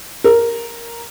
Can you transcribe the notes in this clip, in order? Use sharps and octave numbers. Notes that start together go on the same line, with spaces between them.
A#4